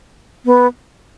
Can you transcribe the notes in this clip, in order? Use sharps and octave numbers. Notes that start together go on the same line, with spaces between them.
B3